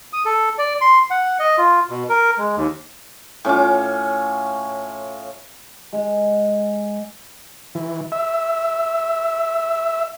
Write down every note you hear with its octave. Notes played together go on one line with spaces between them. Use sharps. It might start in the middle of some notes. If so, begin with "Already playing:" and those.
D#6
A4
D5
C6
F#5
D#5
F4
B2
A#4
G#3
D#2
A2 C#4 F4 D6
G#3
E3
E5